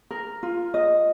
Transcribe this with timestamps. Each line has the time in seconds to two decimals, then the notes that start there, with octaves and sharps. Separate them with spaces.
0.11 A#4
0.43 F4
0.74 D#5